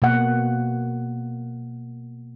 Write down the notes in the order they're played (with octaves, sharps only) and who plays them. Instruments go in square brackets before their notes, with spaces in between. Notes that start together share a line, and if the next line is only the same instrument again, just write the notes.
[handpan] B2 A#3 F#5